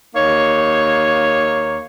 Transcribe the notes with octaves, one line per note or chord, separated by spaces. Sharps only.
D#2 A#3 D#4 C#5